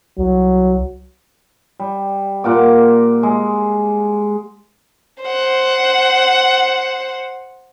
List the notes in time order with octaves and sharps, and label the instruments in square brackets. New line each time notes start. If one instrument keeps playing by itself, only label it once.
[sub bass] C2 [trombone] F#3
[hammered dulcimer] G3
A#2 F#5 D6
G#3
[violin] C5 F#5